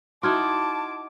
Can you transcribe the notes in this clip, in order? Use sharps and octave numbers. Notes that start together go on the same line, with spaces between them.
D#4 E4 F#4 A5 C6 D6 F6 G#6